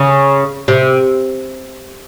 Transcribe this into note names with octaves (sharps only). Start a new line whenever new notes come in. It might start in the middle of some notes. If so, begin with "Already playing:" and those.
Already playing: C#3
C3